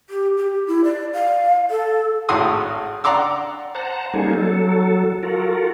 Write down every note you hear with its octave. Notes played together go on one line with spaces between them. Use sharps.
G4
G4
E4
D5
F5
A4
G#1 A2 F#4 C6 D#6 E6
D5 F#5 A#5 C6 D6 E6
C5 F#5 A5 A#5
G3 A#3 C#4 D#4 G#4 A4
F#3 A4
F4 F#4 A4 A#4